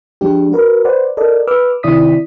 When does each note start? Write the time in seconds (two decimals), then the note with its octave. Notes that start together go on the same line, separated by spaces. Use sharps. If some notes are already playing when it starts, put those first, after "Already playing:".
0.21 F3 G#3 D4 G4
0.52 F#4 A#4 B4
0.85 B4 C5 D5 F#5
1.17 A4 A#4 D5 D#5
1.47 B4 D6 E6 F6
1.83 C3 D#3 E4 D5 D#6 B6